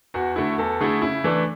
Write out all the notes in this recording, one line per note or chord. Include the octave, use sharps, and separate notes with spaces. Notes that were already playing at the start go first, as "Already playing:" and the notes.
E2 F#4
D3 A3 E4
E2 A4
D3 A3 E4 G#4
C#3 E4
E3 A3 D4